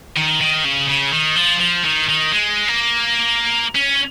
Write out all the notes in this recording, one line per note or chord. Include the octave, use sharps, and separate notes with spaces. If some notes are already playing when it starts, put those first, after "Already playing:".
D#3
D#3
C#3
C#3
D#3
F3
F3
D#3
D#3
G#3
A#3
C#4